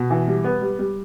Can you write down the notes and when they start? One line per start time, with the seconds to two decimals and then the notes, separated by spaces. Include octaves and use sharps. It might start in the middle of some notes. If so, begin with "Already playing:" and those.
Already playing: B2
0.10 E3
0.27 G3
0.44 B3
0.61 G3
0.79 G3